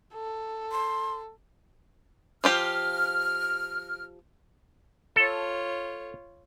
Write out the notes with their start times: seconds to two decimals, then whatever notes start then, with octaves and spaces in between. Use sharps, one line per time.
0.14 A4
0.72 C6
2.44 F3 F4 G4 F6
5.16 F4 A4 C#5